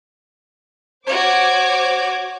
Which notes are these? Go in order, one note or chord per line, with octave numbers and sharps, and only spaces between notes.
F#4 C5 C#5 D6 G#6